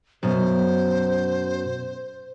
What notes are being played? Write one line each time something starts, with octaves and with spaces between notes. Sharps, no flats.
F#2 B2 C5